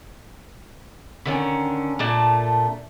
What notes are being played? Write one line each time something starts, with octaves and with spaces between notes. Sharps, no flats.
D3 D#3 C#4
A#2 A3 D4 A5